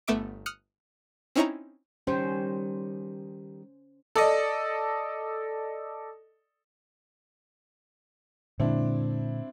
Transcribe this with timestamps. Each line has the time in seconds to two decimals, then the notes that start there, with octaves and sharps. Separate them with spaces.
0.08 G1 A3 B3 E5 D6 D7
0.46 D#6 F6 F#6 C#7
1.36 C4 C#4 D#4 E4 C#5 A#5
2.07 D#3 G3 C#4 G4 C5
4.16 A4 D5 D#5
8.60 A#2 D3 G#3 C4 D4 E4